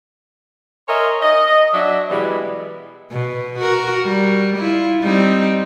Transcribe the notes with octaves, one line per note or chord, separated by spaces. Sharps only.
A#4 C#5 D#5 E5 G#5 C6
D#5
F#3 D4 E5
B2 E3 G3 G#3 B3
B2
F#4 A#4
G3
E4 F4
G3 C4 D#4